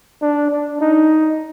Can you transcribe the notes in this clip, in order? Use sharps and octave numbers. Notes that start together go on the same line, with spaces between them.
D4
D4
D#4